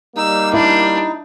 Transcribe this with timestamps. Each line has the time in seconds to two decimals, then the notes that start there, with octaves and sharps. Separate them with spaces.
0.17 G3 A#3 D#4 E6
0.53 D4 E4